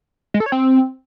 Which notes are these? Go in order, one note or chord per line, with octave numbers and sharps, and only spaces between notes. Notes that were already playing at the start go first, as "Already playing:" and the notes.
G#3
A4
C#5
C4